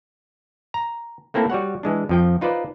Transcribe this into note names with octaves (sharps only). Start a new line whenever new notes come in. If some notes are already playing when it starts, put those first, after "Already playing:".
A#5
A3 A#3 C4 E4 A4
G3 F#4 C#5 F#5
E3 G#3 D4
F2 F3 G5
D#4 F4 B4 C5 D5